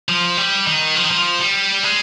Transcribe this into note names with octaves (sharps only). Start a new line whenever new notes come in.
F3
G3
D#3
F3
D#3
F3
G3
G#3